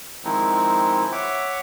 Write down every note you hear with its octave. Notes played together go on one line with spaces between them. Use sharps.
D#3 F3 G#3 C4 D#4 E4
C#5 E5 F#5 D6